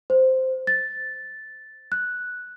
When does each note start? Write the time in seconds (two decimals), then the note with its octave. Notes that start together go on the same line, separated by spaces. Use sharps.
0.10 C5
0.67 A6
1.92 F#6